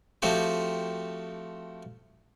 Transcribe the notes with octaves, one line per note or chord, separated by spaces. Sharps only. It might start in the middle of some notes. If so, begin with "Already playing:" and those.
F3 A3 C4 F#4 G4